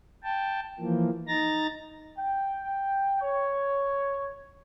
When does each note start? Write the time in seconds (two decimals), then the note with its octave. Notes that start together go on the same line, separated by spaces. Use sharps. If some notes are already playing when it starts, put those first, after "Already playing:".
0.23 G5 A5
0.79 E3 F3 A#3
1.28 D#4 A#5 A6 A#6
2.18 G5
3.21 C#5